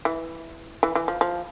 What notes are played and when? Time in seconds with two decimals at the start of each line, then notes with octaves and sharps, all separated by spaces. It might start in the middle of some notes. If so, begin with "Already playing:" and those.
0.05 E3
0.83 E3
0.95 E3
1.08 F3
1.21 F3